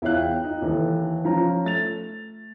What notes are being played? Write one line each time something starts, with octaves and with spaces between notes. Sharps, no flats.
E2 E4 F4 C#5 F5 F#6
G5
D#4 F4
D#2 E3 A4
F3 C#4 F4 A#5
A3 A6 F7